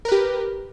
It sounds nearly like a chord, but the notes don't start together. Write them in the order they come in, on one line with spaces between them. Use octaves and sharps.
A#4 B4 G4